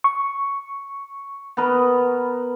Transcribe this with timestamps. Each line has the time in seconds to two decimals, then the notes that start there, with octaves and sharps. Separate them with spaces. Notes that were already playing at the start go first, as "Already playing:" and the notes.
0.04 C#6
1.57 B3 A#4 B4